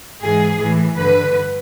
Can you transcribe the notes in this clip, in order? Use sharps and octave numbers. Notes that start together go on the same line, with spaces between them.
G#2 E3 G#4
A2 E3
G2 D3 B4